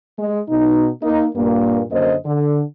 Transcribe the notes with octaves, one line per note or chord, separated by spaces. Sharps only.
G#3
B2 D#4
A#3 D#4
G2 A#2 A#3
F#2 D3 A#3 C5 D#5
D3